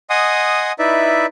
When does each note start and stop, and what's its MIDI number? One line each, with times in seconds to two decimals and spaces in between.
0.10 0.72 75
0.10 0.72 78
0.10 0.72 80
0.10 0.72 84
0.10 0.72 87
0.79 1.26 63
0.79 1.26 64
0.79 1.26 71
0.79 1.26 74
0.79 1.26 76